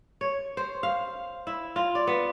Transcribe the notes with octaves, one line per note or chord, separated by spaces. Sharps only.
C#5
C5
F5
E4
F4
D5
B3